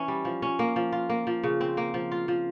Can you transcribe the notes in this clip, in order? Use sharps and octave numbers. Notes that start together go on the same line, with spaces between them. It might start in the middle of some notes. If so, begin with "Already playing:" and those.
Already playing: E3 C#4
G3
F3
C#4
A#3
F3
F4
A#3
F3
C#3
C4
A#3
F3
F4
F3